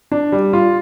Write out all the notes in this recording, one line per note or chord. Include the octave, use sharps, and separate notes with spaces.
D4
G3
F4